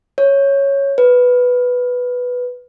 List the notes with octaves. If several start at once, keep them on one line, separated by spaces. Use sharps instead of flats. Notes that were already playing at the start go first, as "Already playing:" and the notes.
C#5
B4